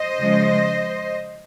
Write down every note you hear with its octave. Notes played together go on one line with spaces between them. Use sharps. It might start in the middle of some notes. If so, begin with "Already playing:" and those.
Already playing: C5 D#5
C#3 F3 G#3